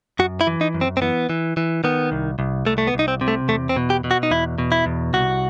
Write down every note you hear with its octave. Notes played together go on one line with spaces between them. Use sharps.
F#2 F#4
E4
E3
D#4
F#2
C4
C4
E3 B3
E3
E3
D#3 B3
C2
C2
C2 A3
A3
B3
C2
D#4
C4
C3
A3
E2 A3
C4
B2
G4
B2
F#4
D#4
E2 E4
B2
E4
E2
C2 F#4